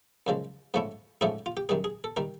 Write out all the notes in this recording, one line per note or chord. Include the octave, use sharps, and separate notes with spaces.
F#2 C#3 F3 G#3
G#2 F3 A3 C#4 E4
G#2 F3 A3 C#4 E4 G#4
F4
G4
F#2 D#3 G3 G#4
G#4
A4
D#3 G3 A#4